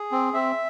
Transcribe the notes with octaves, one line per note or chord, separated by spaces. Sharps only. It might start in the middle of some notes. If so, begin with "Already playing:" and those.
Already playing: G#4
C4
C4 E5